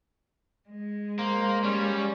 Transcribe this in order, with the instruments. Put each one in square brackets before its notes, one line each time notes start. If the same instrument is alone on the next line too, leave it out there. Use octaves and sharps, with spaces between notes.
[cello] G#3
[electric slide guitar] A#3 [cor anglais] C5
[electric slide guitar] G3 [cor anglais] C#4